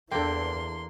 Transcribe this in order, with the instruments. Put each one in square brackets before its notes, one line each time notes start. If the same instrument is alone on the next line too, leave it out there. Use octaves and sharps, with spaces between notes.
[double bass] E2 E3 [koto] A#3 D4 [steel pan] A4 G5 [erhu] C6